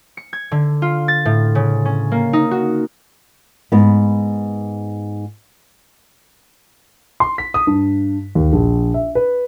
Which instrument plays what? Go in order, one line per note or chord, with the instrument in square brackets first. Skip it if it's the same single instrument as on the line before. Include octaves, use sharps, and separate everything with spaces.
[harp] C#7
G#6
D3
F4
A6
A2
C#3
C#4
A#3
D#4
F#4
[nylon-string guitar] G#2 B3
[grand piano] C6
B6
D#6
G2
D#2
A#1
E5
B4